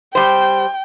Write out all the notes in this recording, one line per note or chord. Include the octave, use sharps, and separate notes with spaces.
G3 C5 G5